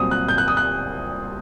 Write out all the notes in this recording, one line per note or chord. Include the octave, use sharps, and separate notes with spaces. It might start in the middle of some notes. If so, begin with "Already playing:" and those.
Already playing: C2 A#2 F#3 C4 D#6
F#6
G6
F#6
D#6
F#6